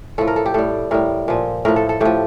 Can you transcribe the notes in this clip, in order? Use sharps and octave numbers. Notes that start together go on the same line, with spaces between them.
A2 F3 A4
A#4
A4
G4
A2 G3 A4
A2 G3 A#4
A#2 F3
A2 F3 A#4
A4
A4
A2 F3 G4